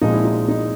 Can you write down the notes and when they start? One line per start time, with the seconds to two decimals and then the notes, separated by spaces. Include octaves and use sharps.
0.01 A#2 F3 G#3 C4 D#4
0.14 E4
0.25 D#4
0.48 D#4